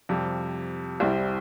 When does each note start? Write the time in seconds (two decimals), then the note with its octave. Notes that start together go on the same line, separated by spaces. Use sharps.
0.09 F2 C3 G3
1.00 C2 C3 G3 C4 E4